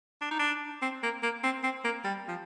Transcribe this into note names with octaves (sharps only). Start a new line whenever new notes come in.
D4
D#4
D4
C4
A#3
A#3
C4
C4
A#3
G3
F3